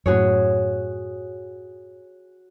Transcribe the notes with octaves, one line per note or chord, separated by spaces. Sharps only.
F#2 A2 F#4 G#4 C#5